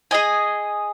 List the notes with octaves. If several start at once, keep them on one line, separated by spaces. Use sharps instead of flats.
G#4 D#5 G#5